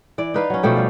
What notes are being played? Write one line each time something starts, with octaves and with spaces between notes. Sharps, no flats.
E3 D5
D#4 B4 F5
F#3 C#4
B2 F3 A3 G4
G3 D5 F5